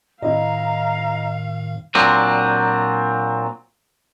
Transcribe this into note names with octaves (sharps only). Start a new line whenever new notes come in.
A2 D#3 E4 D#5 F5 A#5
A#2 F#3 C4 D4